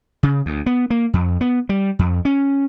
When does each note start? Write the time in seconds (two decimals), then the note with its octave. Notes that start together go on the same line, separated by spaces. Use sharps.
0.23 C#3
0.46 D2
0.66 B3
0.90 A#3
1.14 F2
1.41 B3
1.69 G3
1.99 F2
2.25 C#4